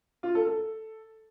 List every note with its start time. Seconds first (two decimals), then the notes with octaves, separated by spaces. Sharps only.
0.23 F4
0.35 A4
0.47 A4